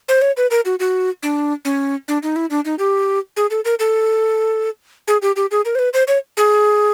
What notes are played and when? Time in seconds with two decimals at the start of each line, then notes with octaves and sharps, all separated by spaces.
0.08 C5
0.22 C#5
0.37 B4
0.51 A#4
0.65 F#4
0.80 F#4
1.23 D4
1.65 C#4
2.08 D4
2.23 D#4
2.36 E4
2.50 D4
2.65 D#4
2.79 G4
3.37 G#4
3.50 A4
3.65 A#4
3.79 A4
5.08 G#4
5.22 G4
5.36 G4
5.51 G#4
5.65 A#4
5.75 C5
5.79 B4
5.93 C5
6.08 C#5
6.37 G#4